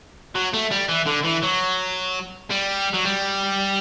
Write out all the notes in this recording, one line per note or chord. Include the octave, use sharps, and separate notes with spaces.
F#3
A3
G3
E3
D3
E3
F#3
G3
F#3
G3